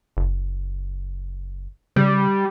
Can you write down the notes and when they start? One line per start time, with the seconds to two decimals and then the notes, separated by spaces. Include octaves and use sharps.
0.17 F#1
1.96 C#3 G3